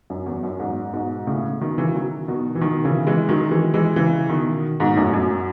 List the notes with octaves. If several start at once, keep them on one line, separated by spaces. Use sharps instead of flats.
F#2
E2
F#2
E2 G#2
G#2 B2
A2 C#3
B2 D#3
C#3 E3
D#3 F#3
B2 D#3
E3
B2 D#3
C#3 E3
E3 G#3
D#3 F#3
E3 G#3
E3 G#3
C#3 E3
B2 D#3
G#2 B2
F#2 A2
F#2